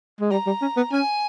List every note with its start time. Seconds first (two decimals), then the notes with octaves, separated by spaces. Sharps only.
0.20 G#3
0.31 G3 A#5
0.47 G3
0.62 C#4
0.77 B3
0.92 C#4 G#5